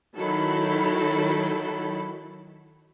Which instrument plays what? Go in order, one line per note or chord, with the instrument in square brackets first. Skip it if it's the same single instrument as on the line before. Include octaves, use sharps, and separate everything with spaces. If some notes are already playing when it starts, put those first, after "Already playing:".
[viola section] D#3 F#3 E4 A4 B5